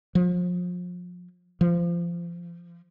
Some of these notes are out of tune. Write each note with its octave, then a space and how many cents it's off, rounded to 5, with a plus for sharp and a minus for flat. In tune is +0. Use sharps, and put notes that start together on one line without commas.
F3 +30
F3 -25